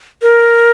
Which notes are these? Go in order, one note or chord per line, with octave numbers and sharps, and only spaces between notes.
A#4